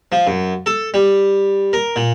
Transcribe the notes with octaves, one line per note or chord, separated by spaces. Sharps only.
F3
F#2
A4
G3
A#4
A#2